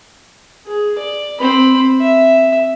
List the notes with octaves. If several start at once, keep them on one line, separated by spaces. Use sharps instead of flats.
G#4
D5
C4 B5
E5